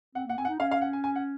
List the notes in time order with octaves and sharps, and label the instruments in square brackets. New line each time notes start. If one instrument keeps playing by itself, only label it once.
[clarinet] C4 [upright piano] F#5
[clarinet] A#3 [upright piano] F#5
[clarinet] C4 [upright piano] G#5
[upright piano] F#5
[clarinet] D#4
[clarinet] C#4 [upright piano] F5
[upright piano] F5
F#5
G#5
G#5
F#5